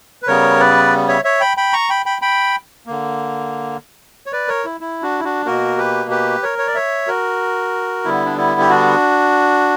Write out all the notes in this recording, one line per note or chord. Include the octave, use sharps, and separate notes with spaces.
B4
C#3 G3 B3 A#4 C#5
B4 D5
C#5 E5
C#5 E5
G5 B5
G5 B5
A#5 C#6
G5 B5
G5 B5
G5 B5
D3 A#3
C#5
B4 D5
A#4 C#5
E4
E4
D4 F#4
E4
D4 F#4
B2 A#3 F#4 A#4
G4 B4
G4 B4
A#4 C#5
C#5
D5
C#5 E5
F#4 A#4
D3 G3 B3 E4
D4
E4
G4
D4 F#4